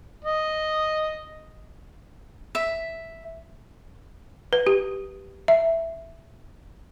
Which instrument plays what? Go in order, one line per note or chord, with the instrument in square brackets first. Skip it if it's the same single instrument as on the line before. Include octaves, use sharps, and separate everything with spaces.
[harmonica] D#5
[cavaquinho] E5
[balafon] B4
G4
E5